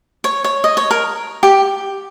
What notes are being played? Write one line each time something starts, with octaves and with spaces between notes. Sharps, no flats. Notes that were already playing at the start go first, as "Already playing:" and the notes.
C#5
C#5
D#5
C#5
A#4
G4